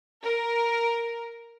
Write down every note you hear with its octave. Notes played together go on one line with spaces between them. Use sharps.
A#4